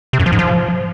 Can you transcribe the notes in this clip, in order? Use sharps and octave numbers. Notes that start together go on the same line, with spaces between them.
C3
F#2
F3
G#2
F3